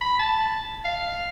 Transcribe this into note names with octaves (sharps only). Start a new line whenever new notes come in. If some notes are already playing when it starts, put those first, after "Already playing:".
B5
A5
F5